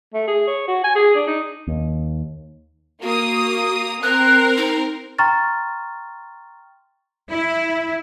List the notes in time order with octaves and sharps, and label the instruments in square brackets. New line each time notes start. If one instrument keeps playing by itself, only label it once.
[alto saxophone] A3
G#4
C#5
F#4
G#5
G#4
D4
D#4
[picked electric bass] D#2
[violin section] A#3 D#6 [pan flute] F#4
[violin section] C4 A#4 [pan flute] F#6
[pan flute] D#4
[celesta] G5 A#5 C6 C#6 F6 A6
[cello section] E4